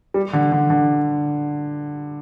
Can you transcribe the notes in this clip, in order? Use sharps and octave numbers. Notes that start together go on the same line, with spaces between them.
G3
D3
D3
D3